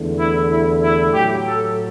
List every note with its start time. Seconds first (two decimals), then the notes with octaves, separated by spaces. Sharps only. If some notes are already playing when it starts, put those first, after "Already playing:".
Already playing: E2 D3 A3
0.17 E4
0.49 E4
0.82 E4
1.13 A2 F#3 A3 G4
1.45 A4